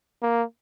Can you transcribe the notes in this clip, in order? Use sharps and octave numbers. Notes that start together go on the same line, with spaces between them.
A#3